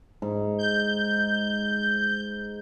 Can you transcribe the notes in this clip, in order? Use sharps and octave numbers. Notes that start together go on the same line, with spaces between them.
G#2
G6